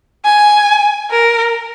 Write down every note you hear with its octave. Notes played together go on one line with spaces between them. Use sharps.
G#5
A#4